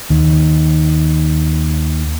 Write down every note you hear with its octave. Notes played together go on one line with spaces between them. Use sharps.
D#2 D#3